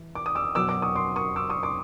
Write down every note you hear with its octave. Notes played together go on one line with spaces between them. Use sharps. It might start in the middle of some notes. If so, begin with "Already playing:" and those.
Already playing: E3
D6
D#6
D6 E6
B2 F#3 B3 D6 E6
D6 E6
C#6 D#6
C6 D6
C#6 D#6
D6 E6
C#6 D#6
C6 D6